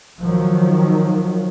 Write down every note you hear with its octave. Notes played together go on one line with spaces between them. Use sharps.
D#3 F3 F#3